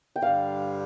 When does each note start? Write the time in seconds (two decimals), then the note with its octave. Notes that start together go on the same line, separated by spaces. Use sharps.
0.16 G5
0.22 G2 D3 G3 F5